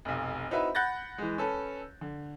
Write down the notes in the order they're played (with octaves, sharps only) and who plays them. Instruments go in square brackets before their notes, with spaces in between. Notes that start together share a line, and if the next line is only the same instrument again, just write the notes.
[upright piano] F1 B1
C4 D#4 E4 F#4 B4 E5
F#5 B5 F#6 G6 A6 A#6
E3 G#3
C#4 A4 B4
D3